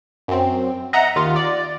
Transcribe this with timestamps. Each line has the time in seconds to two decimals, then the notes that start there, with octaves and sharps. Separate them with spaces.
0.28 F#2 C4
0.93 D#5 E5 F#5 A#5
1.16 D#2 F4 A6
1.36 D5